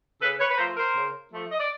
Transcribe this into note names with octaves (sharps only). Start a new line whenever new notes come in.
C#3 A4 B4
B4 C#5
B4
F3 A3 A#4 C5
A#4 C5
C#3
F3 A3
D#5
D5